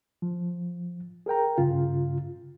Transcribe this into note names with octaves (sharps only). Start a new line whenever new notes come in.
F3
G#4 A#4 G5 A#5
G2 C#3 F4